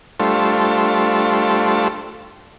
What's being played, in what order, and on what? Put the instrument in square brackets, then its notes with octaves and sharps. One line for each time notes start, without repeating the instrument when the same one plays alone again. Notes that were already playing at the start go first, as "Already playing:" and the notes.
[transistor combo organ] G3 A3 D4 F4 A4 C5